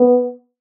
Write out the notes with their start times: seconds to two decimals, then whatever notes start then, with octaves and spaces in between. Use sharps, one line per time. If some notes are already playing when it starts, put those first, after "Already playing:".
Already playing: B3